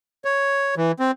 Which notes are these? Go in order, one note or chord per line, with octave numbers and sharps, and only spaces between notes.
C#5
E3
C4